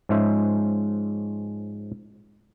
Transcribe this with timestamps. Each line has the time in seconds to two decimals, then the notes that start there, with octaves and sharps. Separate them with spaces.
0.09 G#2 F3 G#3 C#4 C5 E5